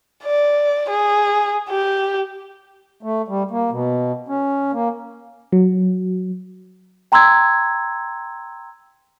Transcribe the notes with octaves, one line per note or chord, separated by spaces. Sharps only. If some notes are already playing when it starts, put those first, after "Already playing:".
D5
G#4
G4
A3
G3
A#3
B2
C#4
A#3
F#3
G5 A#5 C6 E6 G#6